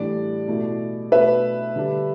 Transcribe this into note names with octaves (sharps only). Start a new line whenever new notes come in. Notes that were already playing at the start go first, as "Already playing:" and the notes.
Already playing: A2 E3 G3 D4 D5
B2 A3 E4
B2 A3 D4 B4 E5
D3 G3 D4